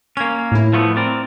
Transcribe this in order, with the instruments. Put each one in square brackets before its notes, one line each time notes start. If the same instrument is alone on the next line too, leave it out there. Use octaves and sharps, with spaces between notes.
[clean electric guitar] A#3 C#4 [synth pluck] G#6
[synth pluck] A2 E4
[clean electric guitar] F3 A3 B3
C4 A#4 D5